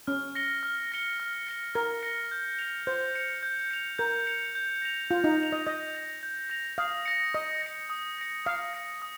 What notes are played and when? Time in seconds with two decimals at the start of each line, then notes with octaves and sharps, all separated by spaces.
0.07 C#4 F6
0.35 A#6 C#7 G7
0.63 F6
0.92 A#6 C#7 G7
1.20 F6
1.47 A#6 C#7 G7
1.75 A#4 F6
2.03 A#6 C#7 G7
2.31 G6
2.59 C#7 F7
2.87 C5 G6
3.15 C#7 F7
3.43 G6
3.71 C#7 F7
3.98 A#4 G6
4.27 C#7 F7
4.55 G6
4.82 A#6 F7
5.10 F4 G6
5.24 D#4
5.39 A#6 F7
5.52 D#5
5.66 D#5 G6
5.94 A#6 F7
6.23 G6
6.50 A#6 F7
6.78 F5 D#6
7.06 A#6 C#7
7.34 D#5 D#6
7.62 A#6 C#7
7.90 D#6
8.18 A#6 C#7
8.45 F5 D#6
8.73 A#6 C#7
9.02 D#6